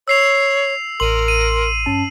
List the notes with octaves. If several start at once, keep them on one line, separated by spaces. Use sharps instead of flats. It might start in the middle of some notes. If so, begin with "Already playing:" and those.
C#5 E6 C7 F7
A1 A#4 C6 D#7 F#7
D#7
G2 C#4 A5